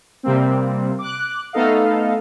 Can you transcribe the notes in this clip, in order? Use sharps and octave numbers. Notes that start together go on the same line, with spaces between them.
C3 G3 A#3 C4
D6 F#6
A3 B3 D#4 A4 D#5 F5